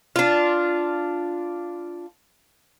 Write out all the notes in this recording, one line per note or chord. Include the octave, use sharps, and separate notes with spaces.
D4 F4